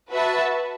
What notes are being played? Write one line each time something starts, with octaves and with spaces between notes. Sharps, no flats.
F#4 B4 E5 A5